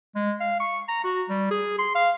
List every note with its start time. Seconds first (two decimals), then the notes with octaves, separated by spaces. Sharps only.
0.15 G#3
0.40 F5
0.60 C#6
0.88 A#5
1.04 F#4
1.29 G3
1.51 G#4
1.78 C6
1.95 F5